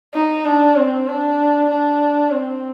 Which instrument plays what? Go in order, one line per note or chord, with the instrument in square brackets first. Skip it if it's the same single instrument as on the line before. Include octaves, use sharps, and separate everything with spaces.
[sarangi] D#4
D4
C4
D4
D4
C4